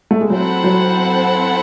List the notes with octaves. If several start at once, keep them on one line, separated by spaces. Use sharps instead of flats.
A3
G#3
F#3 C4 E4 A4 C5 F#5
F#3